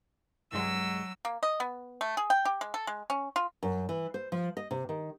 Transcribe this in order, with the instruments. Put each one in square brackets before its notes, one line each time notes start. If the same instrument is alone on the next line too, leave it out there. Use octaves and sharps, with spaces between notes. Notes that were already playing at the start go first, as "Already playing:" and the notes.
[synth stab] C2 G2 G#3 [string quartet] F#3 E6
[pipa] A#3
D#5
B3
A3
G#4
G5
G4
G#3
A4
G#3
C#4
F4
[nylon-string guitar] F#2
E3
C5
F3
D#5
C3
D#3